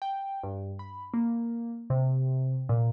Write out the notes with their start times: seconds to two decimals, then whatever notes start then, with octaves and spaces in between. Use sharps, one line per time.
0.02 G5
0.43 G2
0.79 B5
1.14 A#3
1.90 C3
2.69 A#2